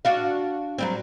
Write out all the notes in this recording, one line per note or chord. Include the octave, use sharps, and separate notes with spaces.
D4 F#4 F5
F#3 G3 C4